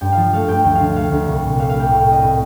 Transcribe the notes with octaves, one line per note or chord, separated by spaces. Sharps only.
G2 G5
F3 F5
A3 F5
G2 G5
D2 G5
D3 F5
A3 F5
D2
C2
A#2
A3 F5
F5
C2
G5
A2 F5
A3 G5
D#5
A2